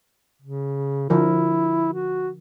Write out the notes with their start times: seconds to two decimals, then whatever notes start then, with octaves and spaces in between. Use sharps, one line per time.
0.42 C#3
1.10 D3 F3 E4 A#4
1.93 F#4